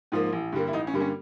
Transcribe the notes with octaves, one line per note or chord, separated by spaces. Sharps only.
G#2 F3 A#3
A1
G2 D3 G3 A#3
E4
A1 D#4
C#4
G2 D3 G3 A#3
C#4